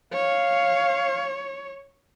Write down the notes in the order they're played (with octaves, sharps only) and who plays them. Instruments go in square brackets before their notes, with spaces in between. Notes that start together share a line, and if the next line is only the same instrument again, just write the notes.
[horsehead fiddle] C#5 [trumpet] F5